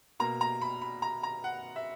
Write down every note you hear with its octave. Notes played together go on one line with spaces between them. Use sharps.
B2 A#3 A#5
A#5
B5
B5
A#5
A#5
F#5
E5